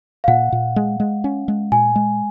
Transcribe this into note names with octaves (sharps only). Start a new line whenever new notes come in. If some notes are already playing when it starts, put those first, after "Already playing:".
F5
A#2 F#5
A#2
G#3
G#3
C#4
G#3
A#2 G#5
G#3